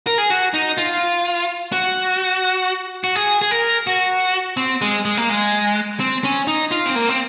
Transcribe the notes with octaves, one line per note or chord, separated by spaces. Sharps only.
A#4
G#4
F#4
D#4
F4
F#4
F#4
G#4
G#4
A#4
F#4
C4
G#3
G#3
A#3
G#3
C4
C#4
D#4
F4
C4
A#3
C4